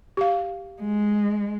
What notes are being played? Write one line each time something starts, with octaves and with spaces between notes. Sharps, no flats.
G4 F5
G#3